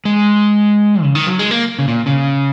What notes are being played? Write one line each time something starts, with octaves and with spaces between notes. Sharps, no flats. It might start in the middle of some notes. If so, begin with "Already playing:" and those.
G#3
C#3
D#3
F#3
G#3
A#3
C#3
A#2
C#3